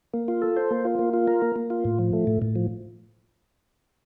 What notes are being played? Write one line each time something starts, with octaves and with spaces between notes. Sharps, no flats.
A#3
F4
A4
C5
A#3
F4
A#3
F4
A#4
A#3
A#3
F4
A2
F3
A3
A2
A2
F3